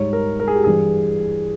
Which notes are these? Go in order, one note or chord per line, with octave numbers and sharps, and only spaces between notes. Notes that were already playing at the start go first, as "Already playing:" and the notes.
Already playing: G#2 G3 C#5
A#4
A#4
G#4
G4
G2 E3 G3 G#4